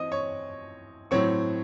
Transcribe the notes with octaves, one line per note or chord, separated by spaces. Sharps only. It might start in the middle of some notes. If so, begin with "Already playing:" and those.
Already playing: E3 C4 D#5 D#6
C#5 C#6
A2 F#3 C4 C#5 C#6